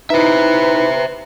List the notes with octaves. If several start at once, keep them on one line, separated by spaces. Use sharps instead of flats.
D#4 E4 B4 C5 E5